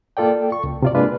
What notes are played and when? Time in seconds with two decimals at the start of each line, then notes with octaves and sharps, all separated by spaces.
0.17 A#3 F4 A4 D5 G5
0.52 C#6
0.64 C#2
0.82 C3 F4 D5
0.95 G#3 A#3 D4 F4 B4